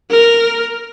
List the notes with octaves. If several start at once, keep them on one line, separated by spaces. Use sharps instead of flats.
A#4